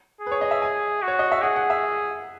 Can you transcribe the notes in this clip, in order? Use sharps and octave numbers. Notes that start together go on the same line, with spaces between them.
G#4
B4
C#5
D#5
E5
G#5
F#4
C#5
D#5
E5
G#4 F#5
F#5
E5